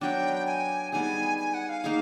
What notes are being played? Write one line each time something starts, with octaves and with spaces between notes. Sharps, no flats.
F#3 B3 D4 G5
G#5
G3 B3 D#4 G#4 G#5
G#5
F#5
F5
A#3 D#4 G#4